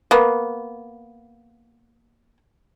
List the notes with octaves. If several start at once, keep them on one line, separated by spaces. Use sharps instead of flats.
A#3 B3